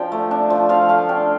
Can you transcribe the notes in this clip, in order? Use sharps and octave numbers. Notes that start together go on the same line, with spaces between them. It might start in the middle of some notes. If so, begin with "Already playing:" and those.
Already playing: F3 D4 G5 A5
A3
D4
F3
F3 F5
A3 F5
D4 G5